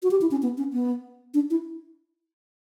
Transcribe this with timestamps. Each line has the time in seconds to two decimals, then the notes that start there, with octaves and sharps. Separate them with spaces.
0.03 F#4
0.11 G4
0.21 E4
0.31 C#4
0.42 B3
0.58 C#4
0.73 B3
1.34 D4
1.50 E4